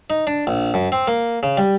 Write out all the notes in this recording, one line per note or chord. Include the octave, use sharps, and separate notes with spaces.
D#4
D4
A#1
F#2
C4
A#3
C#3
G3